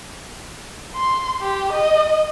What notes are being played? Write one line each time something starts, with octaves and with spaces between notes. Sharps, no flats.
C6
G4
D#5